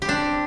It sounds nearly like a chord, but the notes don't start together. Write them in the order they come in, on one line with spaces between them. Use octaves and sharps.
G4 C4 D4